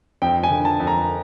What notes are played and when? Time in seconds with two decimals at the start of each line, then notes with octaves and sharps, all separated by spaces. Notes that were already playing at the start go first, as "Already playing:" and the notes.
0.22 F2 G5
0.43 G#5
0.50 D3
0.65 A5
0.80 F2
0.87 A#5